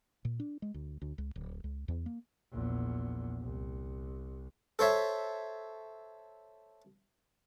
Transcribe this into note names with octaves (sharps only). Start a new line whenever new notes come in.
A#2
D4
G#3
D2
D2
C#2
D1
C#2
E2
A#3
A#1 E2
C2
A4 C5 C#5 E5